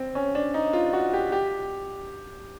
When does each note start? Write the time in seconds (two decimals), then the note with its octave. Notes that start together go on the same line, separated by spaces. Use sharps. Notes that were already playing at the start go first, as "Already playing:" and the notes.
Already playing: C4
0.15 C#4
0.35 D4
0.54 D#4
0.73 F4
0.93 F#4
1.13 G4
1.32 G4